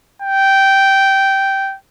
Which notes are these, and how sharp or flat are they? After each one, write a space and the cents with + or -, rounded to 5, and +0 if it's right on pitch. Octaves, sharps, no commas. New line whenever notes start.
G5 -10